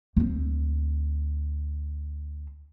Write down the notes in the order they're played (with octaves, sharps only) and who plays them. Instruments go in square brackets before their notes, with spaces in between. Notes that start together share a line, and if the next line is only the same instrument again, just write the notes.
[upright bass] D2 C4